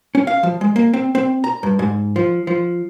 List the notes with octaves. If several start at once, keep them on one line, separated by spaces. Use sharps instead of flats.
C#4
F5
F3
G#3
A#3
C4
C4
A#5
G2
G#2
F3
F3